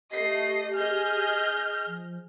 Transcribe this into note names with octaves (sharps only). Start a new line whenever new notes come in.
A3 G4 D#5 C7
G#4 D#5 F6 G6
F3